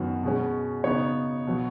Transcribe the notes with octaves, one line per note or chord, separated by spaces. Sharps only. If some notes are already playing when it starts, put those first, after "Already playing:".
Already playing: F#2 D#3 B3 F#4
B2 G#3 C#4
C#3 B3 D#4 C#5
B2 F#3